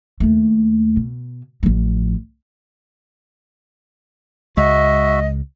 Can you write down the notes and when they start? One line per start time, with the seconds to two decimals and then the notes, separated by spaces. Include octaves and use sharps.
0.20 D#2 A3
0.97 B2
1.63 A1 F3
4.57 C#2 G#3 F#4 D#5 E5